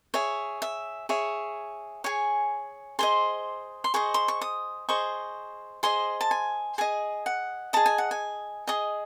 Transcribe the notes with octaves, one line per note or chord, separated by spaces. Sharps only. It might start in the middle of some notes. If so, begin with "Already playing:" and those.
G#4 C#5 E5
E5
G#4 C#5 E5
G#4 C#5 G#5
G#4 C5 D#5 C6
C6
G#4 C5 D#5 C#6
C6
C#6
D#6
G#4 C5 D#5 C#6
G#4 C5 D#5 C6
A5
G#5
G#4 D#5 G#5
F#5
G#4 D#5 A5
G#5
F#5
G#5
G#4 D#5 D#6